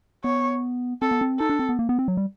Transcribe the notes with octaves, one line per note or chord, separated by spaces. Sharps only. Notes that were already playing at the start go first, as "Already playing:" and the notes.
B3 C#5
C4 A4
B3
C4
D#4 A4
D4
C4
B3
A#3
B3
C4
F#3
G3